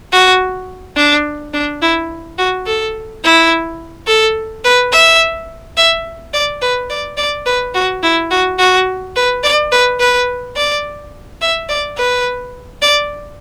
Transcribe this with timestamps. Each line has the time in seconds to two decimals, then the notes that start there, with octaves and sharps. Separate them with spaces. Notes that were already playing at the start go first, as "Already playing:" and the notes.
0.13 F#4
0.97 D4
1.54 D4
1.82 E4
2.38 F#4
2.66 A4
3.23 E4
4.07 A4
4.64 B4
4.92 E5
5.77 E5
6.34 D5
6.62 B4
6.90 D5
7.18 D5
7.46 B4
7.74 F#4
8.03 E4
8.31 F#4
8.59 F#4
9.16 B4
9.44 D5
9.72 B4
10.00 B4
10.57 D5
11.41 E5
11.69 D5
11.98 B4
12.82 D5